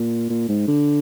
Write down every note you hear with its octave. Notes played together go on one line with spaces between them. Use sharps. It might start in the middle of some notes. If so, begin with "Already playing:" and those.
Already playing: A#2
A#2
G#2
D3